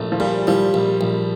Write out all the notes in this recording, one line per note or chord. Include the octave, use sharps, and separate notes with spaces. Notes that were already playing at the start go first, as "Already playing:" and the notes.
Already playing: A#1 A3
F3
A#2 G3
F3 G3
A#1
A#1